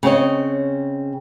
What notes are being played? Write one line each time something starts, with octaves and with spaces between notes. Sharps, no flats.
C#3 C4 C#5 D#5